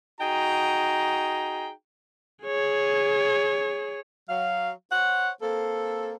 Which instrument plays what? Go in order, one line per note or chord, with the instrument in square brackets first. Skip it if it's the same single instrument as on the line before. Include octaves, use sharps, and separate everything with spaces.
[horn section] D#4 F#4 G#4 G5 A#5
[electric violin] G#4 C#5
[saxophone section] F#3 F5
C5 C#5 F#5
A#3 C4 A4